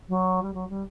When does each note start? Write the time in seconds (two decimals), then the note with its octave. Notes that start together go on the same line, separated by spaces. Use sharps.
0.09 F#3
0.42 G3
0.54 F#3
0.69 G3